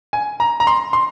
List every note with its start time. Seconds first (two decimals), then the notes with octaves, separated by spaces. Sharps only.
0.13 G#5
0.40 A#5
0.60 A#5
0.67 C6
0.93 C6